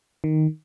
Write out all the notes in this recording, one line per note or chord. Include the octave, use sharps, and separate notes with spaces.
D#3